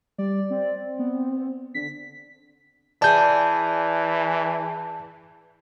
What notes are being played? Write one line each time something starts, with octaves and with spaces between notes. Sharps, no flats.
G3 D5
C4
B3
D3 B6
E3 G#4 D5 A5 G6